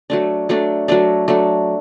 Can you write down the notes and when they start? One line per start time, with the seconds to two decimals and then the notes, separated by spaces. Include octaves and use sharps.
0.10 F#3 A3 D4
0.49 F#3 A3 D4
0.88 F#3 A3 D4
1.28 F#3 A3 D4